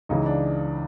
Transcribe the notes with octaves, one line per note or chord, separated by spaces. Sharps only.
C#2 C#3 E3 D#4
D4